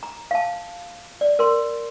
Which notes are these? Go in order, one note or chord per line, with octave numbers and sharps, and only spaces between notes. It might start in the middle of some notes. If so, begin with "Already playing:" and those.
A#5
F5 A5
D5
A#4 C6